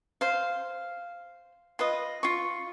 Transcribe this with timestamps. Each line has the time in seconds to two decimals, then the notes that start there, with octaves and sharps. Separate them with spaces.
0.21 C5 F5
1.79 F4 B4 D#5
2.23 F4 C#6